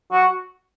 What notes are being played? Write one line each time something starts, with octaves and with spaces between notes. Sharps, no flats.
F#4